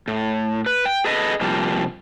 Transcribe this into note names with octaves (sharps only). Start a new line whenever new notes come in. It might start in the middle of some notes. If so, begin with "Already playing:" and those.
A2
B4
G5
G#4 A4 B4 D#5
C3 F3 G3 A#3